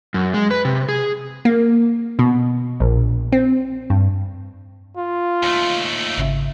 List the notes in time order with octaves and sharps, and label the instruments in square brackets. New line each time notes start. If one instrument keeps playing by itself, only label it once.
[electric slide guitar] F#2
G#3
B4
C3
G#4
[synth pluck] A#3
B2
A#1
C4
G2
[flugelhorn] F4
[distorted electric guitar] D#2 A3
[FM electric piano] G#1 C#3 E5